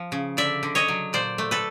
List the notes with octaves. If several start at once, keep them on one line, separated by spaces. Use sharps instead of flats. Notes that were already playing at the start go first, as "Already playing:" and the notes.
Already playing: F3
C#3
D3 D5 E5
D3
C#5 D#5
F#3
A#2 C5 D5
A3
A4 B4